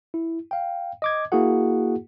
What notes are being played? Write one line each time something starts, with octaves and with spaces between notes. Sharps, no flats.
E4
F5 G5
D#5 D6 G#6
A#3 E4 F#4 G#4 F#5